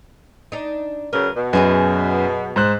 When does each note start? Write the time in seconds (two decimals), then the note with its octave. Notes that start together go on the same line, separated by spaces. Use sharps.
0.52 D4 D#4
1.13 C#3 F#3 A#4 B4
1.36 B2
1.53 F#2 F#3 G#4 B4
2.56 G#2 C5 F#6